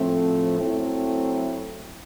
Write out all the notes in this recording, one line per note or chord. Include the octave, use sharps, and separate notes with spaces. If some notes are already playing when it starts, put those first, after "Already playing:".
Already playing: A2 F3 A3 C4
F#3 A3 C4 E4